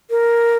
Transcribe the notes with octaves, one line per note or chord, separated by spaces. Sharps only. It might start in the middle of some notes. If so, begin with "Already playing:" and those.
A#4